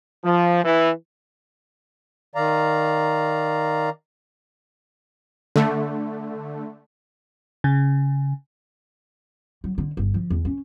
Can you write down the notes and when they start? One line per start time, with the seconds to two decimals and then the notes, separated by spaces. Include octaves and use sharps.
0.24 F3
0.65 E3
2.35 D#3 D5 F5 A#5
5.56 D3 A3
7.64 C#3
9.64 F#3
9.78 D3
9.97 G1
10.14 F3
10.30 E2
10.45 C#4